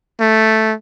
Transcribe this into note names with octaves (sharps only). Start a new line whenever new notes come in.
A3